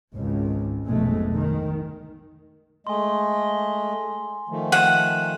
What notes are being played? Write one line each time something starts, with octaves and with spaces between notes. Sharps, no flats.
G#1 C#2
F1 B1 B2 G#3 A3
D#3
G#3 A3 D#5 G#5 C6
D#3 F3 A3
F#5 D#7 E7